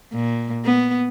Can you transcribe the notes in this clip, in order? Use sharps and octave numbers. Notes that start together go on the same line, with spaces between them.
A#2
B3